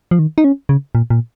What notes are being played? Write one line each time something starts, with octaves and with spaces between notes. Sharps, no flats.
F3
D#3
D#4
C#4
C#3
A#2
A#2